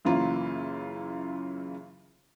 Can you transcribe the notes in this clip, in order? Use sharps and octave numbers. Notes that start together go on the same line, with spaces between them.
F#2 C#3 E3 A#3 F4